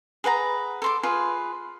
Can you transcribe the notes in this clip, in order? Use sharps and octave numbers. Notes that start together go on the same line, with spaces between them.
G#4 B4 F#5 A#5
A4 C6 D6
F4 G#4 B4 C6